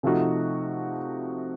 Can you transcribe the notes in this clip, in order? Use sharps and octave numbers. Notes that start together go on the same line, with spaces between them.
C3 F3 A3 D#4 F#4